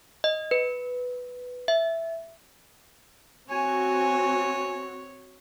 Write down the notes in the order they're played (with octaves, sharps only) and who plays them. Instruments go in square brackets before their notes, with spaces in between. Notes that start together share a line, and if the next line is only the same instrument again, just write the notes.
[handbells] D#5
B4
E5
[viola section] C4 F#4 [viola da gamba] C#5 [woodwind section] G#5